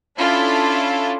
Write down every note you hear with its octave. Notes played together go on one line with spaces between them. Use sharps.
C#4 D4 E4 F4 A4